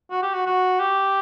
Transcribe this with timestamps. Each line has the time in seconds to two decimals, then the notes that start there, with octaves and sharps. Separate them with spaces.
0.11 F#4
0.23 G4
0.34 F#4
0.46 F#4
0.80 G4